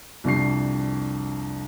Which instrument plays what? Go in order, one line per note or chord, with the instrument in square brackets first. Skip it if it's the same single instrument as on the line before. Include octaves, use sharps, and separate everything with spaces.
[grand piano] C2 F2 D4 C#6 C7